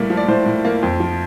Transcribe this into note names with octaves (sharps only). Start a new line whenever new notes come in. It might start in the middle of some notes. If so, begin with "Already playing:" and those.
Already playing: A2 G3 A#3
F3
D5
A2 C5
A2
A#3
F2
F3